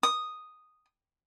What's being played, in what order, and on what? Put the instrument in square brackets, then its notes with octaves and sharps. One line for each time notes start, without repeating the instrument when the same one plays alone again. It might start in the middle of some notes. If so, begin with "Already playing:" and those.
[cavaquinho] D#6